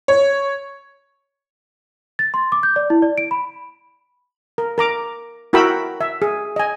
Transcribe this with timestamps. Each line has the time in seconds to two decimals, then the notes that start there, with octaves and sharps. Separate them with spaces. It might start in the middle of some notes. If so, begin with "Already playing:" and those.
0.08 C#5
2.19 A6
2.34 C6
2.52 D6
2.63 G6
2.76 D5
2.90 E4
3.02 D5
3.18 D7
3.31 B5
4.58 A#4
4.78 A#4 A#5 D6
5.53 E4 F#4 A#4 G5 B5 E6
6.01 E5
6.22 G#4
6.56 D#5 G#5